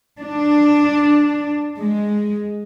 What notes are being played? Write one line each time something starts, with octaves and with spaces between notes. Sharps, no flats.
D4
G#3